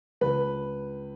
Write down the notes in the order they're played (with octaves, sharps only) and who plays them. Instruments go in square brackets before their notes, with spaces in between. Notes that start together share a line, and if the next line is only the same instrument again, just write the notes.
[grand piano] C#2 B4